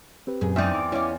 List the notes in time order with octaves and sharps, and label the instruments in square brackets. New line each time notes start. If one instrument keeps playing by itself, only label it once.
[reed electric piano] C4 G4 B4
[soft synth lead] F#2 [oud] A#2 G#4
[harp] E2 C4 D5 [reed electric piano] G2 [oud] D#4 E5
[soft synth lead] D6
[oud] C#4 F4 [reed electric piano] E4 D#5